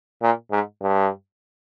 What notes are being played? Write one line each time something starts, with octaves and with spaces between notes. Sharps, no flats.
A#2
G#2
G2